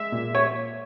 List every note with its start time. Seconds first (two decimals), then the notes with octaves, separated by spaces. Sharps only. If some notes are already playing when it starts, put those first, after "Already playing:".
Already playing: G#3 E5
0.12 A#2
0.35 C#5